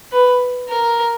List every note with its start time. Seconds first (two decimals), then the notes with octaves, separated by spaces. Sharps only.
0.12 B4
0.68 A#4